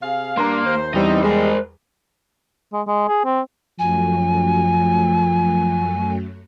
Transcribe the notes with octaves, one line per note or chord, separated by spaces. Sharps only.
C3 G#4 F5
G2 A#3 D4 A#5 C6
D#2 C5
E2 E3 G3 C4 D#4 D#5
G#3 A#4 C5
G#3
G#3
G#4
C4
F#2 F3 F#3 A3 G#5